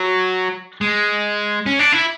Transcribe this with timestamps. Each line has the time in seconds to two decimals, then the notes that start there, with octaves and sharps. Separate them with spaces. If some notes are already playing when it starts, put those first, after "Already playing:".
Already playing: F#3
0.81 G#3
1.66 C#4
1.79 D4
1.92 E4